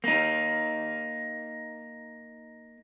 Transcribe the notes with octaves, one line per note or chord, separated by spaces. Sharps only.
A#3 D#4